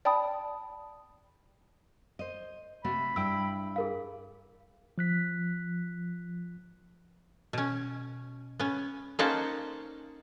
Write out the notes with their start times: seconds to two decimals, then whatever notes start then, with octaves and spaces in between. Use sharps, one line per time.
0.05 D5 G5 A5 B5 D#6
2.19 C5 D#5
2.84 C3 A3 F#4 B5
3.16 G2 E4 G5 E6
3.76 G#4 A#4 F5
4.98 F3 F#6 B6
7.53 B2 C#4
8.59 B3 C#4
9.19 A#3 C#4 D#4 C5 F#5 A5